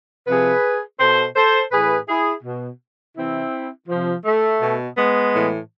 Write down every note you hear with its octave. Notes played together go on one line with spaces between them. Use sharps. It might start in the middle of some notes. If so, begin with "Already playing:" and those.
C3 F3 G#4 B4
B2 A4 C5
A4 C5
A2 E3 G#4 B4
E4 G#4
B2
C3 E3 C4 E4
C3 F3
A3
B2
G#3 B3
A2 E3